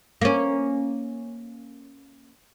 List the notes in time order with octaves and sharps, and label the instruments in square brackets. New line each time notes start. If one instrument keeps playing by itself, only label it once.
[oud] A#3 C#4